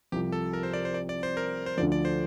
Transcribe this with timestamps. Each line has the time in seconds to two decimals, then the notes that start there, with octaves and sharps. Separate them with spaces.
0.12 C2 C3 F3 G4
0.32 A4
0.53 A#4
0.63 C5
0.73 D5
0.85 C5
0.94 D5
1.09 D5
1.23 C5
1.37 A#4
1.66 C5
1.77 D2 D3 F3 D5
1.92 D5
2.05 C5